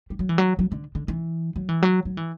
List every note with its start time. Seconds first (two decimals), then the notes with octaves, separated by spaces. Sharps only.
0.10 G3
0.19 F#3
0.29 E3
0.38 F#3
0.59 F#3
0.72 D3
0.95 D3
1.08 E3
1.56 F#3
1.69 E3
1.82 F#3
2.05 F#3
2.17 E3